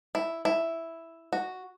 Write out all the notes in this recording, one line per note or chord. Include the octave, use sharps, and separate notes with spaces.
E4
E4
F#4